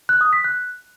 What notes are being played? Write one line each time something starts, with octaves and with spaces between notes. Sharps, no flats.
F#6
D#6
B6
F#6